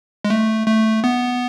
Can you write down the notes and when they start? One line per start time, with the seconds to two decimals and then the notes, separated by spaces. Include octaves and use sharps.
0.25 G#3
0.30 A3
0.67 A3
1.04 B3